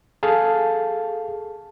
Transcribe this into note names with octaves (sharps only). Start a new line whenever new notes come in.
G#4 A4 F5 A5